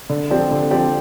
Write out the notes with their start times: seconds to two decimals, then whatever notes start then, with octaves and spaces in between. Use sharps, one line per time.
0.09 D3
0.30 F3 C4 G4 D5
0.51 D3
0.71 F3 C4 G4 D5